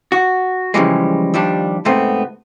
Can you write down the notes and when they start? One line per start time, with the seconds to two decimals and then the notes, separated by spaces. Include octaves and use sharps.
0.12 F#4
0.74 C#3 E3 F3 G3 G#3
1.34 D#2 F3 G3 D4
1.85 G#2 C3 A3 B3 C4